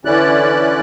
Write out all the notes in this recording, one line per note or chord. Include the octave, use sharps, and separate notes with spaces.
D3 E3 C#4 E4 D5 F#6